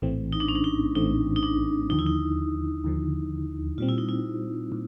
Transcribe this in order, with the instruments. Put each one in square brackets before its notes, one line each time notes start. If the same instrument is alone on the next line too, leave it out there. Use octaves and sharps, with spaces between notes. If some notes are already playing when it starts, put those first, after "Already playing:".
[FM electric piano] A#1 A2 E3 A3 C4
[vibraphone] D#4
D4
C#4
D4
D#4
[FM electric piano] A#1 A2 E3 A3 C4 [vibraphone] D#4
[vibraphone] D#4
D4
[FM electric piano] D#2 D3 F3 [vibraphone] D#4
[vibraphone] E4
D#4
[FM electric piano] D#2 D3 F3
[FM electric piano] A#2 G3 C4 [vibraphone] F4
[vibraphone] E4
D#4
E4
[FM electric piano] A#2